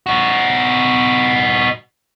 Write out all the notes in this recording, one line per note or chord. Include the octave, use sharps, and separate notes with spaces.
D#4 F#4